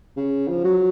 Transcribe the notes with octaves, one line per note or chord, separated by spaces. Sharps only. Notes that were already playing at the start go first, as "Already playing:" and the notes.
C#3
F3
F#3